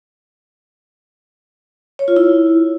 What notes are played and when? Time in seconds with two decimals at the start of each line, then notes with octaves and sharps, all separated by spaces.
1.99 C#5
2.08 F4
2.16 E4